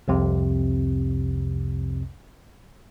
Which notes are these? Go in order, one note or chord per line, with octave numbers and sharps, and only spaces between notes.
C2 F2 C3